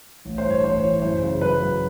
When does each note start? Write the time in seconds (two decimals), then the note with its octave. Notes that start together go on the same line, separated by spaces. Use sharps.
0.25 A1
0.38 C5
0.45 G2
0.50 C#5
0.63 A1 C5
0.83 E3 C#5
1.02 F#2 C5
1.21 C#3
1.41 F#2 B4
1.61 F#3